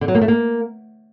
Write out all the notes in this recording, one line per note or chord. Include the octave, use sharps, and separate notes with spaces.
D3
F#3
A#3
A3
A#3